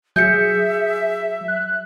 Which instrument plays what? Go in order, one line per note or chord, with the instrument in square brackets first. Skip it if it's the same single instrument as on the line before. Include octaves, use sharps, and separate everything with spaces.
[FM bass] F#3 [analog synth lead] G#4 [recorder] E5 [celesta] G6 C#7
[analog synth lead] F#6